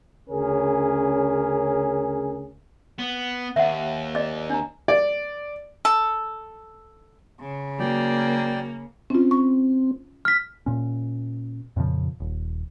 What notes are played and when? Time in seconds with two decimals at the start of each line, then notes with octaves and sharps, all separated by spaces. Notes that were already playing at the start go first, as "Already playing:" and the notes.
0.30 D2 C#3 C#4 G#4 A#4
2.99 B3
3.56 D#2 E5 F#5
4.15 D5 D#5 D6
4.50 D4 A#5
4.88 D5
5.85 A4
7.40 C#3
7.79 F#3 A#3 D5 G5
9.10 C4 C#4 F4
9.31 C#6
10.25 F6 B6
10.66 A#2 C#4
11.76 F2 A#2 C#3 F3
12.20 D#1